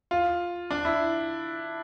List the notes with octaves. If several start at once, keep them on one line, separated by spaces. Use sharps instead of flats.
F4
D4
E4